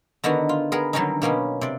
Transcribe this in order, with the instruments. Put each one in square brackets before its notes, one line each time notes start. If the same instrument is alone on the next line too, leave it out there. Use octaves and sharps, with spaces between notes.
[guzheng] D3 D#3 B3 D#4 F#4
F4
B3 G#4 A#4
D3 D#3 F#3 G3 C#4 D#4
B2 A#3 B3 C#4
C3 D5